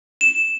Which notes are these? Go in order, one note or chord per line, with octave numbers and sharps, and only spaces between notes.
E7